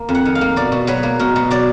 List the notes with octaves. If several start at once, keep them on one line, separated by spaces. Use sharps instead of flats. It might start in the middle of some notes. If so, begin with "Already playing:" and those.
Already playing: A#3
F2
F#5
D#3
F5
A#3
B2 D5
B2
F#3 B4
A#3
B2 A#4
B2
F#3 D5